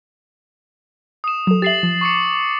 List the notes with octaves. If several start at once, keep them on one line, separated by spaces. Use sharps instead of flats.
D#6 E7
F#3 A4
G4 E5 A6 C7 F#7
F3
C#6 D6 C#7